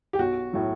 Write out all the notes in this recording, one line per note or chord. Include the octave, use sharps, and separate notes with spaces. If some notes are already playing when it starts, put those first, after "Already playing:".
G4
B1 F#4
A2 F#3